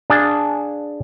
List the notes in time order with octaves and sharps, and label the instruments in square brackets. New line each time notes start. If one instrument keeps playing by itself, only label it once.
[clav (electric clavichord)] D4 G#4 F5 A5